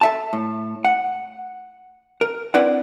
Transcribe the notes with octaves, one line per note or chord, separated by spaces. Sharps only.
A4 E5 A5
A2
F#5
A#4
C4 D4 E4 B4 D5 F#5